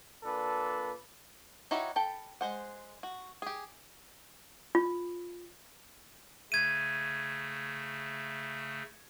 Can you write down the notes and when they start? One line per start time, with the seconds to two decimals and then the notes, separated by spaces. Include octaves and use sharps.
0.23 A#2 D4 A4 B4
1.71 D#4 E4 F#4 G4 C#5
1.96 A4 G5 B5
2.41 G#3 C5 F#5
3.03 F#4
3.42 G4 G#4
4.75 F4
6.52 C#3 A3 G#6 D#7